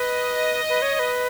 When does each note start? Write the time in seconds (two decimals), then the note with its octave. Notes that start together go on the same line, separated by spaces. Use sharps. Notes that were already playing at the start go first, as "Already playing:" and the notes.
Already playing: B4 D#5
0.69 B4
0.82 C#5
0.94 C#5
0.99 B4